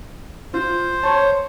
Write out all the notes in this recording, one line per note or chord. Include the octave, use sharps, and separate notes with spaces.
F4 C5
C#5 A5